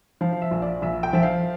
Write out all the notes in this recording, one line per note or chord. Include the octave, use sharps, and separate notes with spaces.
F3 F5
F5
E5
A#1
D5
A#1 E5
G5
F3 E5
F5